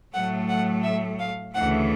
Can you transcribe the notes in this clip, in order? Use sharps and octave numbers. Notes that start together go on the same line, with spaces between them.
A2 F#3 A3 F#5
F#5
E5
F5
D2 C#3 E3 A3 F#5